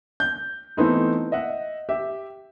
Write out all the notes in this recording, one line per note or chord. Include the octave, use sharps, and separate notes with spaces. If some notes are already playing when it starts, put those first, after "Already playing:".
G6
E3 A3 B3 C4 D#4 E4
D#5 E5 F#5
G4 E5